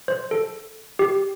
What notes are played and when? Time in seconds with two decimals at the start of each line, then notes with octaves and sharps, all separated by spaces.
0.08 C5
0.31 A4
0.99 G4